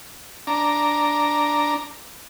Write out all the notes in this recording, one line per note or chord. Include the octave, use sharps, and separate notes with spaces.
D4 A#5